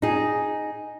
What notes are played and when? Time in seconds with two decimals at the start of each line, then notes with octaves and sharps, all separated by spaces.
0.02 D#4 G#4